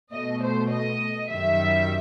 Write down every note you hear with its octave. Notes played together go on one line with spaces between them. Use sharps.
B2 A3 D#5
C5
D#5
F#2 D#3 G3 E5